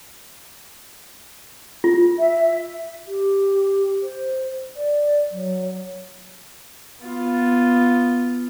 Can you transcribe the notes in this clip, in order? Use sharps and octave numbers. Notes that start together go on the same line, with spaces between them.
F4
E5
G4
C5
D5
F#3
B3 F4